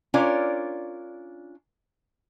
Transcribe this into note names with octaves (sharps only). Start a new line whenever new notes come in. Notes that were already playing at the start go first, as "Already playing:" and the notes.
C#4 D4 F4 A#4 C#5 D5